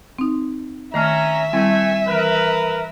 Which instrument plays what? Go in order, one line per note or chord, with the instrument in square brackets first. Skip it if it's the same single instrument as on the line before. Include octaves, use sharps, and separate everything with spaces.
[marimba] C4 D#4
[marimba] D#3 A3 F6 [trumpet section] C#4 A#5 [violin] E5
[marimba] G3 C4 E4 [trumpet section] A3 G#5
[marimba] E3 [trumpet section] A#4 B4